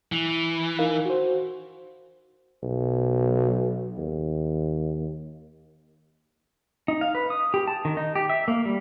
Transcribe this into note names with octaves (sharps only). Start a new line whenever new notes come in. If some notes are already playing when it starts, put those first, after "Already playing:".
E3
D#4 A#4 F5
F#4 C5
B1
D#2
D#4
F5
B4
D#6
G4
A5
D#3
D#4
G4
E5
A#3
G3